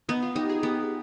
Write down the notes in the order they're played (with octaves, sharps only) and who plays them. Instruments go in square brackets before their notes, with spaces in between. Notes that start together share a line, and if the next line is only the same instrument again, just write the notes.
[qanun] B3 [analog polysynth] D#4
[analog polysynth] F4
[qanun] D#4 [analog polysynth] G4
[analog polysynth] G#4
[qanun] B3 [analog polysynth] G4